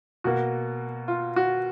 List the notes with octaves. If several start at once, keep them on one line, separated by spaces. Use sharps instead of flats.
B2 A#3 F#4
F4
F#4